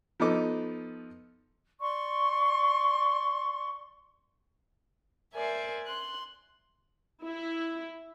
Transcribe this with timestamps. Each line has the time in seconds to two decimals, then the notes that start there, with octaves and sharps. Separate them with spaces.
0.20 F3 B3 D#4 A4 D#5 D6
1.80 D5 C6 C#6
5.34 A#4 C5 D5 E5 G#5
5.86 C6 F#6
7.24 E4